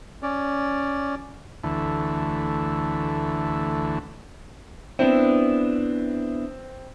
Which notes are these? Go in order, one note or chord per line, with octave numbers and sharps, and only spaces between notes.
C#4 D5
D2 E3 A3
B3 C4 D4 E4